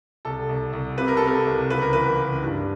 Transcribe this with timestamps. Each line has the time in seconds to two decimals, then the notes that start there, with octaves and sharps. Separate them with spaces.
0.25 C2 A4
0.49 C2
0.73 C2
0.97 C3 B4
1.08 A#4
1.17 A4
1.22 C3 A#4
1.46 C2
1.70 C#2 B4
1.82 A#4
1.93 E3 B4
2.19 C#2
2.43 G2